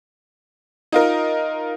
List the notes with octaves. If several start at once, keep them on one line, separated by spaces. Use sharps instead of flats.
D#4 F4 A#4